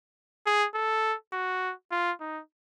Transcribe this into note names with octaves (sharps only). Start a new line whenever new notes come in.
G#4
A4
F#4
F4
D#4